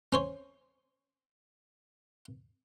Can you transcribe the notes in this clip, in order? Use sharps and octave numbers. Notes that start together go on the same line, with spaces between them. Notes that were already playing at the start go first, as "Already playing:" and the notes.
C#4 C5 C#5